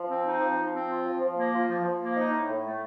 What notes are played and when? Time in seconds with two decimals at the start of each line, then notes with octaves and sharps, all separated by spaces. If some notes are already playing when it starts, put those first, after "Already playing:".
Already playing: F3
0.08 C4
0.24 D#4
0.40 F3
0.56 F3
0.72 C4
0.88 F4
1.04 F3
1.20 F3
1.36 A#3
1.52 F4
1.68 F3
1.84 F3
2.00 A#3
2.16 D#4
2.32 A2
2.48 A2
2.64 A3